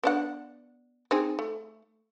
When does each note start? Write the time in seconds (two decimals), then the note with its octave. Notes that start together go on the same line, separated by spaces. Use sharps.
0.03 B3 D4 F#5
1.11 C4 D#4 G#4
1.39 A3